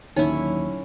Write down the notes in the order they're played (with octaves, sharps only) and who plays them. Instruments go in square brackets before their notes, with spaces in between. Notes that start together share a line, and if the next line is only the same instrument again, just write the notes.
[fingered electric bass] D#2 [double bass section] A#2 D3 F#3 [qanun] C#4 E4 [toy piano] D#4